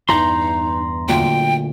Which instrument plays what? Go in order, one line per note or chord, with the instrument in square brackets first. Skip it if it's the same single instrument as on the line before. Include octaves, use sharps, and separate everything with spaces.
[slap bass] E2 G2 E3 [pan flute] D#4 [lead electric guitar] A#5 C6
[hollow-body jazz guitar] D2 A#2 [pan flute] G5